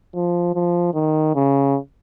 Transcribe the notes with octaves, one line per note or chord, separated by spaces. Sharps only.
F3
F3
D#3
C#3